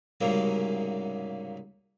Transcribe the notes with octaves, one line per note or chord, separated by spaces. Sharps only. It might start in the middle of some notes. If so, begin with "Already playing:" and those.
C2 G#2 C#3 F#3 A#3